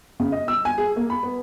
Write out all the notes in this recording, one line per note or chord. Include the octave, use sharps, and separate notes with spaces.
C#3
D#5
E6
G#5
G#4
A#3
B5
B3